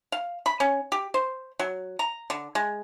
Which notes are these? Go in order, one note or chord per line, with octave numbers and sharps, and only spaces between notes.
F5
B5
C#4
G4
C5
F#3
A#5
D3
G#3